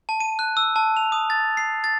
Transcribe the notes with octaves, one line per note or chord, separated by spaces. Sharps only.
A5
D#7
F#6
E6
A5
F7
D#6
A6
C7
A6